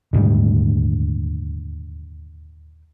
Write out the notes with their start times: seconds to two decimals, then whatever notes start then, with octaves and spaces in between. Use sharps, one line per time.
0.13 D#1 D2 G#2 G3